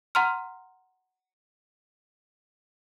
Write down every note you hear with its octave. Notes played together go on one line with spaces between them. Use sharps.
F#5 A#5 C6 F6